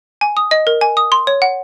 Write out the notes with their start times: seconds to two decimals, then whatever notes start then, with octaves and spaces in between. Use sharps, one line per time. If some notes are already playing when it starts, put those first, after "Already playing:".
0.21 G#5
0.37 D#6
0.51 D#5
0.67 A#4
0.81 G#5
0.97 D#6
1.12 C6
1.27 C#5
1.42 F#5